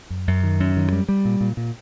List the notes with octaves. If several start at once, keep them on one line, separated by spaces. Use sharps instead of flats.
F#2
F#2
D#3
F#2
D#3
G3
G3
A#2
A#2
A#2